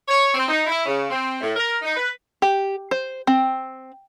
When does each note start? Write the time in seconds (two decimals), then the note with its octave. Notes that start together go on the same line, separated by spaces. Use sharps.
0.08 C#5
0.34 C4
0.48 D#4
0.67 E4
0.86 C#3
1.10 C4
1.41 A2
1.56 A#4
1.82 D#4
1.96 B4
2.42 G4
2.91 C5
3.27 C4